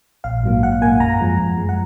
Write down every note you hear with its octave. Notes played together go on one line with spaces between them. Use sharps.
A#1 F5
G#2 F#3 A#3
A#1 F#5
G#2 F#3 A#3 G#5
F#2 A#5
F3 G#3
F#2
F3 G#3
F#5